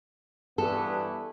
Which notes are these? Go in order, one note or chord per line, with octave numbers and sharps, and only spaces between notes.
G2 E3 B3 A4